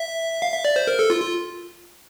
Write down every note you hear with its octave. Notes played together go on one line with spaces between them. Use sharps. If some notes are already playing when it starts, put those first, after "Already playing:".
Already playing: E5
F5
E5
D5
C5
A#4
A4
F4
F4